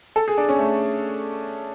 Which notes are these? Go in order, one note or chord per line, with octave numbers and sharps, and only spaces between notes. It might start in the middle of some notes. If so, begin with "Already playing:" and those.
A4
G#4
D4
C#4
A3